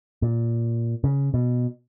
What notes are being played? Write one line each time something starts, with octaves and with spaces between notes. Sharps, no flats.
A#2
C#3
B2